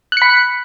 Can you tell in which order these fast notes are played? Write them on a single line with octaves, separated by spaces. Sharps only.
F#6 C#7 B5